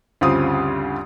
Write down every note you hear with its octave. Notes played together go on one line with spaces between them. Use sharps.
D2 G2 C#3 C4 F4 D#6